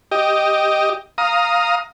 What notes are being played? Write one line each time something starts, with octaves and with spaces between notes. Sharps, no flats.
G4 D#5
F5 A#5 D#6